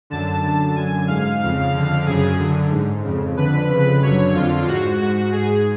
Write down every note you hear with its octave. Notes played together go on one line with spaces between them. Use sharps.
F#2 D3 A5
F#2 D3
F#2 D3 G#5
G#2 F5
F2 C#3
F2 D3
F#2 C#3 G#4
F#2 D3
G#2
F2 C#3
F2 D3 B4
F2 C#3 B4
F#2 D3 C#5
F2 D3 F4
G#2 F#4
G#2 F#4
G#2 G#4